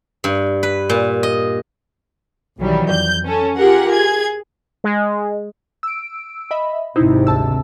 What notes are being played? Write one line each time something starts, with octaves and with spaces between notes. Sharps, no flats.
G2
B4
A#2
D#5
B1 D#3 E3 F#3 G3
F2 G6
C#4 A4
F4 G4 G#4 A#4 F#5
G#4 G#6
G#3
E6 D7
D#5 E5 B5
G#1 C3 D#4 E4 C5
D2 A5 E6